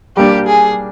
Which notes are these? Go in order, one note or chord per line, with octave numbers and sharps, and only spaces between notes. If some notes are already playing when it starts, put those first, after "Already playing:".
G3 A#3 D4 G4
G#4